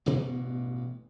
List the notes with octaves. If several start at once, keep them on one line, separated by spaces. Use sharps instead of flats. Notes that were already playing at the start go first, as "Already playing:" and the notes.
A1 G2 B2 B3